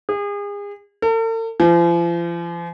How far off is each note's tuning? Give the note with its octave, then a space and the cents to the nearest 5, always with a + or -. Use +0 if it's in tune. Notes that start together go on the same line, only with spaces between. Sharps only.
G#4 -35
A4 +45
F3 -40